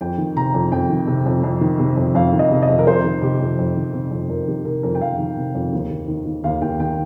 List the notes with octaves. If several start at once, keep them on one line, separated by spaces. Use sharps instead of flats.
F2 G5
D#3
C3 A#5
F2
F2 G5
D#3
C3
F2
F2
D#3
C3
F2
F2 F5
D#3
D#5
C3
D#5
F2
A#4
F2 C5
D#3
C3 G4
F2
F2
D#3
C3
F2
F2 A#4
D#3 G4
C3 A#4
F2 A#4
G5
F2 F5
D#3
C3
F2
D#2
D#2
D#3
D#3
D#2 F5
D#2 G5
D#3 G5